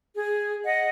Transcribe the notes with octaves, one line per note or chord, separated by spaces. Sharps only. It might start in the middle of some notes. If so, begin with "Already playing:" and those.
G#4
D#5 F#5